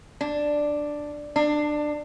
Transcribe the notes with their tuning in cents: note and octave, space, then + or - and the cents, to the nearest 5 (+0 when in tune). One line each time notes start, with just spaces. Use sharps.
D4 +5
D4 +20